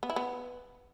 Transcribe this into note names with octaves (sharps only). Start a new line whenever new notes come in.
B3
E4
B3